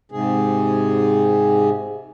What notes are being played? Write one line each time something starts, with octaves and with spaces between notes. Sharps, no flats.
G#2 C3 G#4